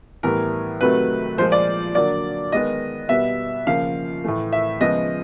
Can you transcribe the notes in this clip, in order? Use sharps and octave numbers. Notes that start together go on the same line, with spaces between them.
A2 E3 G3 B3 A#4
C3 D#3 F#3 A3 B4
A#2 F3 G#3 C5
D5
D3 F#3 A#3 D5
D#3 G#3 B3 D#5
B2 G3 B3 E5
C#3 F3 A#3 F5
A2 E3 A3
E5
C#3 F3 G#3 B3 D#5